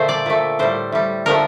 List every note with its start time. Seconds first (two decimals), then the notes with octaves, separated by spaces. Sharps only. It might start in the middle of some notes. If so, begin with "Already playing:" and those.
Already playing: A#2 D3 F3 A3 C5
0.09 D5
0.26 A#2 A3
0.59 A2 G3 C5
0.92 A2 G3
1.26 D3 F3 A3 A#4